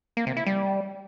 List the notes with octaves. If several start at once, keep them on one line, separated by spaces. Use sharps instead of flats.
A#3
C3
E4
G3